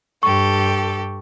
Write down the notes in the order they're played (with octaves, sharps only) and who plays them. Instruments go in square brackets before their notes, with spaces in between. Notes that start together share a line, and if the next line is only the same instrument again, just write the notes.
[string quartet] G2 G4 A4 [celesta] C#6